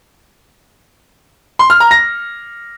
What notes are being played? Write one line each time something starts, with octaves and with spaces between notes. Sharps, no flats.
C6
F6
A#5
A#6